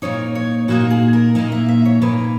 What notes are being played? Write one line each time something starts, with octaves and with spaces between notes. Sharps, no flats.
A#2 A#3 D#4 C#5
C#5
A#2 A#3 D#4 F#4
G#4
A#4
A#2 A#3 D#4 D#5
E5
E5
C#5
A#2 A#3 D#4 B4